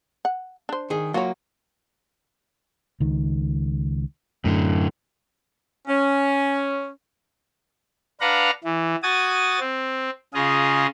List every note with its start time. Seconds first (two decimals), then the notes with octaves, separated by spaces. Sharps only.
0.25 F#5
0.69 D4 C5
0.90 D#3 G#4
1.14 F#3 A#3 F4 F#4 C#5
3.00 C#2 D#3
4.45 F#2 A2 D3
5.88 C#4
8.21 D4 B4 F5 F#5 A#5
8.64 E3
9.03 F#4 G#5 D#6 A6
9.60 C4
10.34 C#3 F4 G#4 D#5